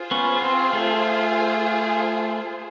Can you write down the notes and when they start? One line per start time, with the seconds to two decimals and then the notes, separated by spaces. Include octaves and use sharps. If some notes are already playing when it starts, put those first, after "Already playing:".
Already playing: F4 G#4 C5
0.11 B3 C#4
0.42 C4
0.73 A3